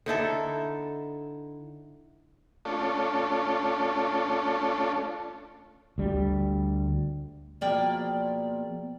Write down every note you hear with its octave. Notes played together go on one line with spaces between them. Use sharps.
D3 D#4 E4 A4
A3 C#4 D4 F4 A4
D2 G3
B2 F3 A#3 G#4 D5 G5